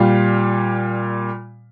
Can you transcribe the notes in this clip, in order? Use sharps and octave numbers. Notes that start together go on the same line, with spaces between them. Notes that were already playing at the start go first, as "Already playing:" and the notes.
Already playing: A#2 G3 F5